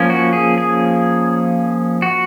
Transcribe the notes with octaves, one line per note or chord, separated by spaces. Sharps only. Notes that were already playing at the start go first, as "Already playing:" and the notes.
Already playing: F3 A#3 C#4
F#4
G#4
G#4
F#4